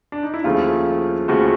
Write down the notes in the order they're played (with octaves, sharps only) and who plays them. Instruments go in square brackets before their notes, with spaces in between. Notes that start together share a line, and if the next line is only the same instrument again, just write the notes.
[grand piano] D4
D#4
E4
D#2 C#3 F3 A3 F4
D#2 C#3 F3 A3 F#4